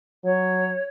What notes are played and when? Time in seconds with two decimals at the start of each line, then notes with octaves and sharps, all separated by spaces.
0.24 F#3 C#5